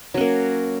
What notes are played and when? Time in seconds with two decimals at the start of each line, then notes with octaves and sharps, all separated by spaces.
0.14 F#3
0.17 C#4
0.21 A#3